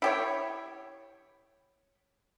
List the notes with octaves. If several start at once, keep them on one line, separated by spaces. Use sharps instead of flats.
E4 G4 C#5